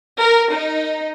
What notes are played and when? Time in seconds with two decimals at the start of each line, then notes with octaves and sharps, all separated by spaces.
0.20 A#4
0.53 D#4